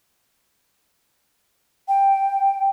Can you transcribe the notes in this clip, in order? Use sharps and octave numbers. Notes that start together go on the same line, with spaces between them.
G5